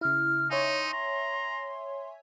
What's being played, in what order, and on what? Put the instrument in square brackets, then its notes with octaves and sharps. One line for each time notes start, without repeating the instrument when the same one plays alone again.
[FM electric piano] C#3 E4 [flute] F6
[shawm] D#4 [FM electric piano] C#5 E5 G#5 [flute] C6
[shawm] A#5